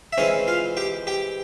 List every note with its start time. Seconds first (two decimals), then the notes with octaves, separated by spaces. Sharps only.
0.13 E5
0.18 E3 G#3 C4 C#4 C#5
0.48 F4 F5
0.77 G4 G5
1.07 G4 G5